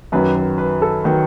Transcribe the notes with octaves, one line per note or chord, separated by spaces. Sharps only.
F#2 D#3 F#3 B4
B4
B4
A4
D#3 F#3 B4